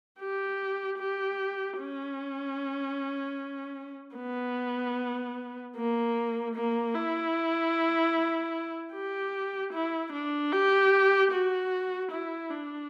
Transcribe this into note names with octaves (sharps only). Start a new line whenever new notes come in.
G4
G4
C#4
B3
A#3
A#3
E4
G4
E4
D4
G4
F#4
E4
D4